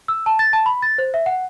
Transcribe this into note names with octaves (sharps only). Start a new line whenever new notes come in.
E6
A5
A6
A5
B5
A6
C5
E5
F#5